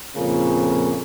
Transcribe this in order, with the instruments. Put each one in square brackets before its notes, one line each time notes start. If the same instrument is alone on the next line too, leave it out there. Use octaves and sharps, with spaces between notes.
[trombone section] F2 A#2 C#3 A#3